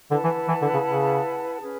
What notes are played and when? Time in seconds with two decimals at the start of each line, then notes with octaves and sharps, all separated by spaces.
0.11 D3 E4 B4 F#5 A5
0.24 E3
0.48 E3
0.62 D3
0.74 C#3
0.87 C#3
1.62 C#4 G#4 B4